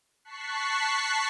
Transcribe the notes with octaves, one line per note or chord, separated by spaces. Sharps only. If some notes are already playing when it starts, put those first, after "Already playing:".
A5 C#6 F#6 B6 C7